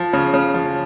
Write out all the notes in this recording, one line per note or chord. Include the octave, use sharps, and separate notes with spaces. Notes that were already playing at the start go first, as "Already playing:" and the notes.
Already playing: F3
C#3
C#3
F3